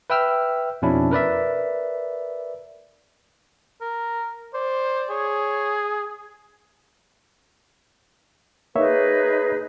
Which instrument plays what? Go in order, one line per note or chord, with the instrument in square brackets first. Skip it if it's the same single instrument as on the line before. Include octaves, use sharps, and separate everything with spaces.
[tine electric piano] B4 E5 G5 E6 F6
F2 B2 C#4 D4 E4
A#4 B4 D5 E5
[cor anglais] A#4
[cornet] C5 [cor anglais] D5
[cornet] G#4 [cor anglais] C#5
[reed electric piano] A#3 C#5 E5 [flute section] D#4 G#4 B4